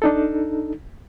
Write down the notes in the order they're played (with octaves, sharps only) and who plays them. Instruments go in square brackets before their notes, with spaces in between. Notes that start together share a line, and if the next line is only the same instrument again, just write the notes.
[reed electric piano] D4 D#4 A4